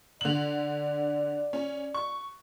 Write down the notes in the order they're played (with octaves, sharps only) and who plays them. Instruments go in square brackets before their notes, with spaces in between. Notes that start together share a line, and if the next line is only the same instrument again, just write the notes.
[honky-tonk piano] D3 F#7 [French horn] D5
[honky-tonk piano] C#4
C#6